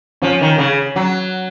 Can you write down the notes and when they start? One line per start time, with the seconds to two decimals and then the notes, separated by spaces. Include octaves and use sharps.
0.22 F3 C#4
0.41 D#3
0.58 C#3
0.96 F#3